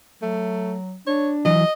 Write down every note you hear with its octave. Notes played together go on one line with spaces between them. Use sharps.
F#3 A3
D4 C#5
E3 F#3 D#5